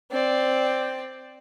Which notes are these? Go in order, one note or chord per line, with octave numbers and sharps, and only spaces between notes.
C4 D5